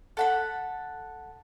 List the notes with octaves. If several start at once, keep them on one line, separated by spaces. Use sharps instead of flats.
A4 F#5 B5